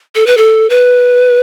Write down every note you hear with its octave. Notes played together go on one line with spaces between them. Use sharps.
A4
B4
A4
B4